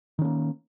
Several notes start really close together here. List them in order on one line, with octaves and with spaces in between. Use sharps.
D#3 C#4 A#3